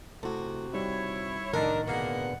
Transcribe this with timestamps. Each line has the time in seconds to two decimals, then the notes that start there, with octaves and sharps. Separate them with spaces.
0.23 C3 A3 E4 F#4 A4
0.73 G3 D#4 E4 C#5
1.53 C2 A2 D3 D#3 D4 D#4 A#4 A6
1.87 B2 D3 A#3 G#4 F#5